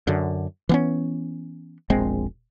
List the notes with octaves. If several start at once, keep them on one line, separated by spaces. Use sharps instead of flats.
F#2 D3
E3 B3 C#4
E1 A#1 G#3 C4